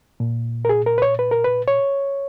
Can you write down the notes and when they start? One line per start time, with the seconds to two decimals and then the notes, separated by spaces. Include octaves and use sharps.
0.20 A#2
0.65 A#4
0.69 G#4
0.86 A#4
0.98 B4
1.02 C#5
1.19 B4
1.31 A#4
1.45 B4
1.68 C#5